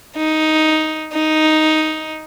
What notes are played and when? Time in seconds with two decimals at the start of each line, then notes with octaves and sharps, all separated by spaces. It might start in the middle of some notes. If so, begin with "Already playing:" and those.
0.17 D#4
1.13 D#4